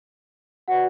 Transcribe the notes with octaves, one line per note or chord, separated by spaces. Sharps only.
F#4 B4 D5 F#5